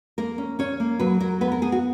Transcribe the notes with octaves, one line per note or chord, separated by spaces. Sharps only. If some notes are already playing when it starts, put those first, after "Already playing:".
A#3 A#4
C#4
C#4 C#5
A#3
F#3 B4
F#3 A#4
B3 B4
A#4
B3 G#4
F#4